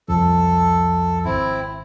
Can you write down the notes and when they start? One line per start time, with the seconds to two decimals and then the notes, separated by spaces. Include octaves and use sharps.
0.08 C2 F2 F3 A4
1.25 G#1 C4 E4